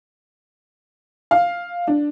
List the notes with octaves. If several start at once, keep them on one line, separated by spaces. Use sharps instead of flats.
F5
D4